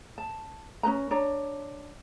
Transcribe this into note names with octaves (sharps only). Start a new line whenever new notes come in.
A5
C#4 D#4 B4 A#5
D4 C#5 A#5